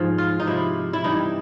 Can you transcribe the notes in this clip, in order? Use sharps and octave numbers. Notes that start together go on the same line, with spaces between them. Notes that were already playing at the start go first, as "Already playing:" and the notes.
Already playing: G#2 F3 G#4
F4
D#4
C3 F3 E4
E4
G2 E3 G3 D#4